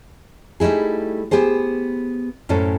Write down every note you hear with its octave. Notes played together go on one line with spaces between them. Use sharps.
G3 A3 D#4 E4 G#4
B3 G4 G#4 C5
F#2 A2 C#4 A4 C5